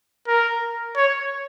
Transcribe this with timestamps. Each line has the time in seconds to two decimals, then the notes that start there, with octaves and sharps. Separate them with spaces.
0.28 A#4
0.96 C#5